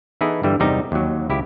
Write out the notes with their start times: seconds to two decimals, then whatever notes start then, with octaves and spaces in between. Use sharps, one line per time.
0.21 E3 B3 D#4 E4 G#4 A4
0.43 G2 D3 E3 G3
0.60 E2 C3 G3 D#4 A#4
0.92 D#2 F#3
1.30 C#2 C#3 E4 G4